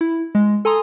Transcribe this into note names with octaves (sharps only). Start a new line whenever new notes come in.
E4
G#3
A4 G#5 A#5 C6 D#6